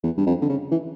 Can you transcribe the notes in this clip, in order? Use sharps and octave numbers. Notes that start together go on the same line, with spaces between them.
E2
G2
F2
D3
C#3
E3